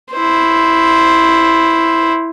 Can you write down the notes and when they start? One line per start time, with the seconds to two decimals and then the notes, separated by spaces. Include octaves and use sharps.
0.13 E4 C5